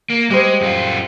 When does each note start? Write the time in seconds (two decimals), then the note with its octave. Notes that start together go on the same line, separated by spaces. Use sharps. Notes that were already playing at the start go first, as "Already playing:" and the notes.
0.10 A#3
0.30 G3 G#3 G#4 C5
0.61 F#2 F4